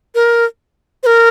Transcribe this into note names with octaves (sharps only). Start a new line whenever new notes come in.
A#4
C5
A#4